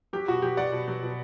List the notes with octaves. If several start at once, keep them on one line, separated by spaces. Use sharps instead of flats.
F#3 G4
B2 F#4
F#3 G4
F#3 D5 F#5
B2
F#3
B2